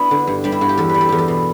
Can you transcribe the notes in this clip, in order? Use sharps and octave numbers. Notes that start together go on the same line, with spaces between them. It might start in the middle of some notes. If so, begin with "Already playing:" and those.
Already playing: B3 D4 E4 F#4
D3
G2
G3 D4
E4
G2 F#4
G4
E2 A4
G3 B4
A4
E2 G4
A4
B2